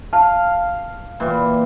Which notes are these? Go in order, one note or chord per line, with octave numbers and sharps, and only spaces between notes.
F5 A5
A#2 E3 G3